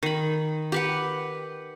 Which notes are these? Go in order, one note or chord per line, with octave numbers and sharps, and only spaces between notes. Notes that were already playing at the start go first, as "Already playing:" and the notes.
D#3 B5
G4 B4 F#5